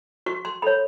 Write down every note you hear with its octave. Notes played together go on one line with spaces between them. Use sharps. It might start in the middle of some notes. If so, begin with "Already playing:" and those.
F#4 C#6
C6
A4 C#5 B5